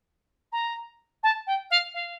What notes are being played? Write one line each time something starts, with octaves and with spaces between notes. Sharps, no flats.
A#5
A5
G5
F5
F5